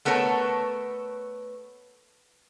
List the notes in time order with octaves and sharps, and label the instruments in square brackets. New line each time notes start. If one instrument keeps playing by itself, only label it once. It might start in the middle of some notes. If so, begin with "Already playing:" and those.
[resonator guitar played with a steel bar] A3 B3 A4 A#4 C#5